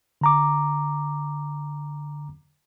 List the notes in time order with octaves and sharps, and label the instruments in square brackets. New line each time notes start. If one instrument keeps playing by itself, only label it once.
[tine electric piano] D3 A#5 D6